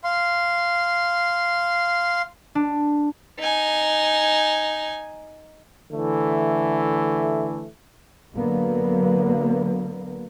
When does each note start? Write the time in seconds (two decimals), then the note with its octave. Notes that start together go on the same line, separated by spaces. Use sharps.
0.04 F5 C6
2.55 D4
3.39 D#4 G#5
5.92 D3 E3 A3
8.35 D3 F#3 A#3 B3